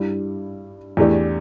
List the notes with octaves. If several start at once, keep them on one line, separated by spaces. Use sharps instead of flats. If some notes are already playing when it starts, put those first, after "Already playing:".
Already playing: G2 G3 E4
E2 E3 A3 D4 G4